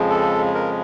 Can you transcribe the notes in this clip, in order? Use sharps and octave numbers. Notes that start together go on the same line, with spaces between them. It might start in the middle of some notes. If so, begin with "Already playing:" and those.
Already playing: F2 C#3 F3 G#3
A4
A#4